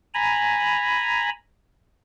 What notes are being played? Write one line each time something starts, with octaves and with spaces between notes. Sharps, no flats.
G#5 A#5 B5